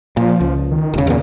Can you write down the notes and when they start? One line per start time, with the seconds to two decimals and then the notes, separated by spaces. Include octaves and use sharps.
0.17 A#2 F3
0.40 C#2
0.71 D#3
0.94 E1 C#3
1.07 E2 A#2 C#3